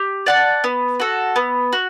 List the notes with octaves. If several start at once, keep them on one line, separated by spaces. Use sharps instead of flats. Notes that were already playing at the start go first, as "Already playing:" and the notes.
Already playing: G4
D5 F#5 A5
B3
F#4 A4
B3
F#4